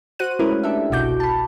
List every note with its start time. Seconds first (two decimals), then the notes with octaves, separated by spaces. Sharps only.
0.19 F#4 C5 F#6 D#7
0.39 G#3 A3 C#4 E4 A#4 B4
0.63 D4 G4 A4 E5
0.90 G1 C2 B2 F#4 D6 G6
1.20 A5 B5